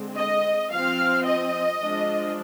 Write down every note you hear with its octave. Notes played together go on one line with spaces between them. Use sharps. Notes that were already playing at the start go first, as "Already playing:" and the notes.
Already playing: D3 G#3 C4
D#5
F3 C4 F5
D#5
F3 G#3 D4